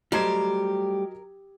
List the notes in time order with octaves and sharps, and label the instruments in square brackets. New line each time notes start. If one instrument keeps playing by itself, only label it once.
[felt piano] F#3 D#5 G#6 [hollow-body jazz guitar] G3 A3 C5 [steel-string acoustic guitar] G4 [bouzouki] A#4